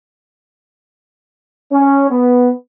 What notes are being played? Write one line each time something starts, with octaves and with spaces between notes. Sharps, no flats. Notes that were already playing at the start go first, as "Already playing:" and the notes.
C#4
B3